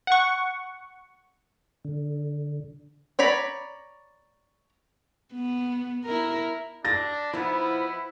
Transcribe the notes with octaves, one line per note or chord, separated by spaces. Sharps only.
F#5 C#6
D3
C#5 D5 A#5 B5
B3
E4 A#4
D4 A6 A#6
F3 B3 D#4 E4